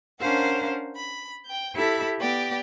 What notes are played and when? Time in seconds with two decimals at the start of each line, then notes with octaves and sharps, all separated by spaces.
0.19 C#4 D4 A#4 C5 F5 F#5
0.96 B5
1.45 G5 G6
1.75 E4 G4 A4 E5 B5
2.18 B3 G4 D5